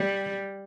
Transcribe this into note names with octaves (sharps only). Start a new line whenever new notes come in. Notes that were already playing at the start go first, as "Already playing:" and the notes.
Already playing: G3